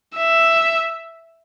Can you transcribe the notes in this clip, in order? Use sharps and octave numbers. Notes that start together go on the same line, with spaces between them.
E5